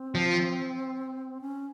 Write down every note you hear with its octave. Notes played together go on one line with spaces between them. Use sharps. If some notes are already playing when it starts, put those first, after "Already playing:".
Already playing: C4
F3
C#4